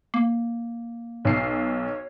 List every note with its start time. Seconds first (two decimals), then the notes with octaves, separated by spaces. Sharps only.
0.14 A#3
1.25 B1 C#5 C7